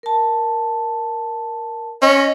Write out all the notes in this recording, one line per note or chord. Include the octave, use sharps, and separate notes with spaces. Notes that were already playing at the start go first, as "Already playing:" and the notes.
A#4 A5
C#4 D#5